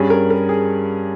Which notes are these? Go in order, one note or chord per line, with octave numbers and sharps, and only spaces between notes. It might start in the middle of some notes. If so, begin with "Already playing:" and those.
Already playing: G2 G3 C#4 G#4
A#4
A#4
G#4